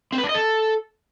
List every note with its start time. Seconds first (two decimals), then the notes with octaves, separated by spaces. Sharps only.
0.13 C4
0.18 B4
0.24 D4
0.29 D#5
0.35 A4